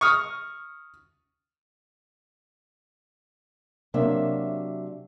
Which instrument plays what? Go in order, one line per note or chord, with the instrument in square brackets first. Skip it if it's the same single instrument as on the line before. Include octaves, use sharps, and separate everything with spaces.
[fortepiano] C#6 D#6 F6
[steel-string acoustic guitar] C3 F#3 A#3 D4 E5